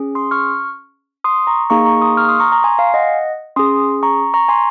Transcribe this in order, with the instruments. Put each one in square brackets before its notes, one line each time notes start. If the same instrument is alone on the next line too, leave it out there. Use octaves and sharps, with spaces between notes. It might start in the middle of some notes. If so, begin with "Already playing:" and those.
Already playing: [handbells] C#4 G#4
C6 D#6
C#6 F6
C6 D#6
A#5 C#6
A#3 D#4 G#4 A#5 C#6
A#5 C#6
C6 D#6
C#6 F6
C6 D#6
A#5 C#6
A#5 C#6
G#5 C6
F5 G#5
D#5 F#5
C#4 G#4 C6 D#6
A#5 C#6
A#5 C#6
G#5 C6